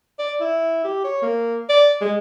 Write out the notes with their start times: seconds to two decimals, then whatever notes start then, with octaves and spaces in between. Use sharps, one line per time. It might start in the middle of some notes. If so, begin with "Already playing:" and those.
0.19 D5
0.40 E4
0.84 G4
1.04 C#5
1.22 A#3
1.69 D5
2.01 G#3